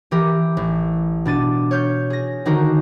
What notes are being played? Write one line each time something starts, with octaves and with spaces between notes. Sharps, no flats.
E3 G4 A#4
A1
B2 D4 A6 D#7
C#5 F6 G6
G#4 A#6
D3 D#3 D#4 F#4 A#4 C5